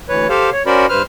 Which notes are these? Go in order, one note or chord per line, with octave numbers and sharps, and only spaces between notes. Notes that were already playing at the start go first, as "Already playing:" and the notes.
D2 E3 B4 C#5
G4 A4 C5 F5
C#5
C#4 F#4 A#4 C5 D5 B5
G2 B4 C5 F6